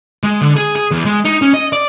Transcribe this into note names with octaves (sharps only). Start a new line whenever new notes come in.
G#3
D3
G#4
G#4
E2
G#3
D#4
C#4
D#5
D5